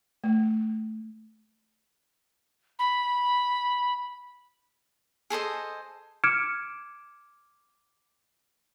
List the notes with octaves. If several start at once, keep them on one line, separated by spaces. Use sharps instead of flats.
A3
B5
G#4 A4 C5 D#5
D6 F6 G#6 C#7 D7 E7